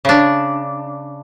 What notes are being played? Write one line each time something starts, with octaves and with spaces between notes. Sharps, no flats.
C#3 D4